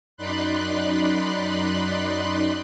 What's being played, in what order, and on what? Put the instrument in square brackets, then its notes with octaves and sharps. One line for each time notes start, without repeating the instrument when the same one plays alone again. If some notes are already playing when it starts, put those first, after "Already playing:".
[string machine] F#2 D#4 D5 B5 C6 F#6